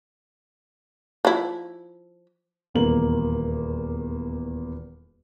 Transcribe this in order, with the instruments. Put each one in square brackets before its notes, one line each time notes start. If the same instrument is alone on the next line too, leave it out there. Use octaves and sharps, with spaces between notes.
[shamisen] F3 E4
[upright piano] D#1 E2 A#3 F#7